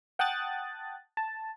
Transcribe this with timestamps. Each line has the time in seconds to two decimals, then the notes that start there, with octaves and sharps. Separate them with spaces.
0.19 F#5 G5 A5 D#6 F#6 A6
1.17 A5